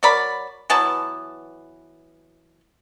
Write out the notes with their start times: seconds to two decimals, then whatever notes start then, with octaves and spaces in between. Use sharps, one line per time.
0.03 F#3 A#4 D5 B5
0.70 E3 F#3 B3 A5